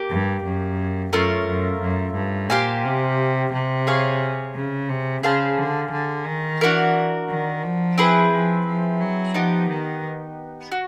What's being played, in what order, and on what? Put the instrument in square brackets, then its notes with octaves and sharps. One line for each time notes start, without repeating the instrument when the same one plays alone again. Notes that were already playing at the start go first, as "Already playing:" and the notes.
Already playing: [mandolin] A#3 G4
[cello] G2
F#2
[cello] F#2 [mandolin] A3 C#4 F4 A#4
[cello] F#2
F#2
G2
[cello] A#2 [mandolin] G4 C5 F5 G#5
[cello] C3
C3
[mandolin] G#4 C#5 F5 G#5
[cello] C#3
C3
[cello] C#3 [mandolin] G#4 C5 F5 A5
[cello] D3
D3
D#3
[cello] E3 [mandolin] D4 F#4 A#4
[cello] D#3
F3
[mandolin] C4 E4 G#4 B4
[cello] F3
F3
F#3
[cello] F3 [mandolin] B3 D#4 G4
[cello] D#3
[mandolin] F#4